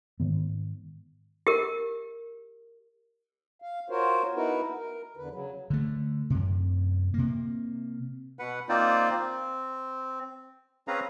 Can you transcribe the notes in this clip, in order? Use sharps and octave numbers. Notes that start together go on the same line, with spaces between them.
G#2 D#3 B3
G4 A#4
F5
F4 F#4 A#4 C5 C#5
B3 D#4 E4 F#4 A#4 B4
A#4
E2 D3 B4
C#3 F#3
D3 A3
F#2 C3
C3 A#3
B2 B4 F#5
A#3 C4 D#4 F4 C5 D5
C4
C4 C#4 G#4 B4 F5 A#5